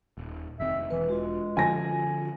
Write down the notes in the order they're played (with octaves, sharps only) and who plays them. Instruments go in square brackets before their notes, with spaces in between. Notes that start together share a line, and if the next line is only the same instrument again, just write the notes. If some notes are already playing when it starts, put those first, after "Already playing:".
[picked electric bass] D#1
[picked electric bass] F1 D#3 C4 [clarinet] E5
[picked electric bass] E1 [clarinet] E3 [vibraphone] B4
[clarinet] G#3 [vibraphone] F4 F#4
[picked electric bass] D3 F3 C#4 [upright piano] G#5 A#6